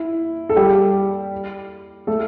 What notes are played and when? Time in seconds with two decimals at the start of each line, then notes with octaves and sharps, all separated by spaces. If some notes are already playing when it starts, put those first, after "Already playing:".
Already playing: E4
0.49 A4
0.56 G3 G4
2.07 A3 A4